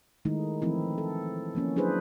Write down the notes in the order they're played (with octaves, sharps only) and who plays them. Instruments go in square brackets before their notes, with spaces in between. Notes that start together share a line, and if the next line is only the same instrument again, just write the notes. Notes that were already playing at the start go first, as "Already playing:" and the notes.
[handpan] D#3 G#3 A3 D#4 E4
E3 F3 A3 C4 D#4 E4
A4
F3 A#3 C#4
F#3 D4 E4 G#4 B4 C5